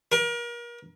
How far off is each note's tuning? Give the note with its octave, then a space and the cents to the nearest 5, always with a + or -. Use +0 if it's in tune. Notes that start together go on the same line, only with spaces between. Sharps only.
A#4 +35